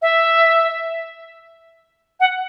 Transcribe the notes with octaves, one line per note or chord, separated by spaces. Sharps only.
E5
F#5